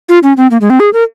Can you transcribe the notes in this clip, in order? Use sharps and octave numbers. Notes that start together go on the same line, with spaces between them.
F4
C#4
C4
A#3
G#3
C4
G#4
A#4